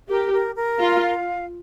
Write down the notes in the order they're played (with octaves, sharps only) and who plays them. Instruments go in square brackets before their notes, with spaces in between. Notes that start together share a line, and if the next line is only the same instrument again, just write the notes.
[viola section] G4 [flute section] A#4
[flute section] A#4
A#4
[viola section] F4 [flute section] F5
[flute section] F5